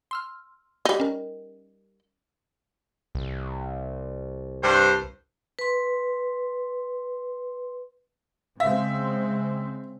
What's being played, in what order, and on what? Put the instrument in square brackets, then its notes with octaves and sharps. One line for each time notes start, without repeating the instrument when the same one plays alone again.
[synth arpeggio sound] C6 E6 F6
[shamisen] G3 D#4
[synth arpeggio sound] C#4 A#4
[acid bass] C2
[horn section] G2 C5
[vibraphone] B4 C6
[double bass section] C#3 G#3 C4 [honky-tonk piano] E5 [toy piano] F5